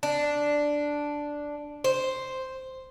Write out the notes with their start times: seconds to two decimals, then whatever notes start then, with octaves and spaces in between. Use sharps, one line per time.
0.03 D4
1.84 C5